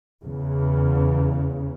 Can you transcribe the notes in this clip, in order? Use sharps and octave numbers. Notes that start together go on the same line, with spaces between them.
E2 C#3